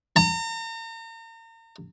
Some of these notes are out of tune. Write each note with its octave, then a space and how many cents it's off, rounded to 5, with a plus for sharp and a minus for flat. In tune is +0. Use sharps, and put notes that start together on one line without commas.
A#5 -40